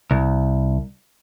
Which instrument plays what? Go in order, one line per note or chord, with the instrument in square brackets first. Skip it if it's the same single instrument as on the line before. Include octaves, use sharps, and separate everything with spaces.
[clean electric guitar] C2